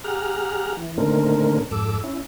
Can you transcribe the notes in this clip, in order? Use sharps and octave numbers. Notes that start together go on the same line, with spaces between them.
G4 G#4 F#5 A#5 F6
E3
A#2 D3 D#3 A3 C4 A#4
F2 G#2 A4 D6 E6
C#4 E4